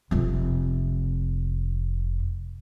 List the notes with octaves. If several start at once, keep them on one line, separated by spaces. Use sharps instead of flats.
F1 C3